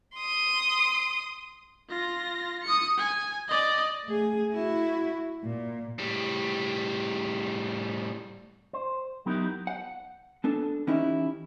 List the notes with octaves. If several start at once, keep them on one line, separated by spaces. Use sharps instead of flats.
C6 D#6
F4 A#6
D#6 C#7
G#5
D5 D#5
A3 G#4
E4 F#4
A#2
A2 G3
C5
F#3 B3 D#4 E4 G4 A#4
F#5
B3 D4 A4
E3 C#4 D#4 E4 G4